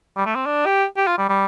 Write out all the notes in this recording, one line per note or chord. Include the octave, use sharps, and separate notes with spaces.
G3
A3
C4
D4
G4
G4
F4
G3
G3